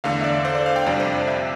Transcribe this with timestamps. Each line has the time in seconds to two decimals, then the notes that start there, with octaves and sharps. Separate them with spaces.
0.04 E2 D3 A3 F5
0.21 E5
0.24 D5
0.45 C5
0.55 D5
0.66 F5
0.76 G5
0.86 F2 C3 G3 D4 D5
1.00 C5
1.14 D5
1.27 E5